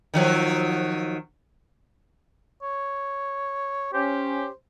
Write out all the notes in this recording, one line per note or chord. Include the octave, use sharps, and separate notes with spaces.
D#3 F3 F#3
C#5
C#4 G4 C5